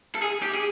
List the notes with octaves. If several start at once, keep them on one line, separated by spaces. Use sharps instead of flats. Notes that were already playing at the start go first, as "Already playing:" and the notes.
A4
G#4
G4
G#4